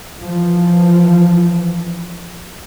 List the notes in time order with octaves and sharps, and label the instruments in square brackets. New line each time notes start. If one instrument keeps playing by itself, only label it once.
[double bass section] E3 F3